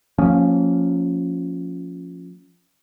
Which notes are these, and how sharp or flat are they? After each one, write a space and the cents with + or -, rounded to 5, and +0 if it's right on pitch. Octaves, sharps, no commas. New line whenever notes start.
F3 +15 A#3 -25 C#4 +0